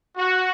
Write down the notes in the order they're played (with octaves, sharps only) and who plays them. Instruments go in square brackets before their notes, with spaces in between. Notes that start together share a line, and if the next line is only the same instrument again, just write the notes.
[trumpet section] F#4